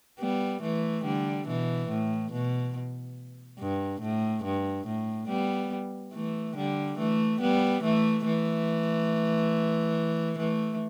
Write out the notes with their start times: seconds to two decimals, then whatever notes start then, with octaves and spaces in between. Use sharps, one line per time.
0.19 G3 B3
0.62 E3 A3
1.05 D3 G3
1.47 B2 E3
1.89 A2
2.32 B2
3.59 G2
4.01 A2
4.44 G2
4.87 A2
5.29 G3 B3
6.13 E3 A3
6.56 D3 G3
6.98 E3 A3
7.41 G3 B3
7.83 E3 A3
8.25 E3 A3
10.38 E3 A3